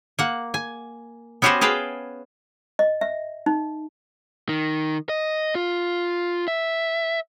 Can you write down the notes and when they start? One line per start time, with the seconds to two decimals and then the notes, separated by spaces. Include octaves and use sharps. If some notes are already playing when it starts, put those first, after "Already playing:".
0.19 A#3 F#5
0.54 G#5
1.42 B3 C#4 F#4 G4 B4 C5
1.61 G#4 B4 F5 G5 A5
2.79 D#5
3.01 E5
3.46 D#4
4.49 D#3
5.09 D#5
5.55 F4
6.48 E5